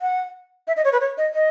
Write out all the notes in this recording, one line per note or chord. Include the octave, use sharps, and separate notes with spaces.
F#5
E5
D#5
C#5
B4
C#5
D#5
D#5